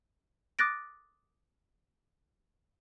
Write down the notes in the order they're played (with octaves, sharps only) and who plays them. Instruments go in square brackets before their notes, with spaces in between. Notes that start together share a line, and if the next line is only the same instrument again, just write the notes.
[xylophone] D6 D#6 F#6 A6 A#6 D7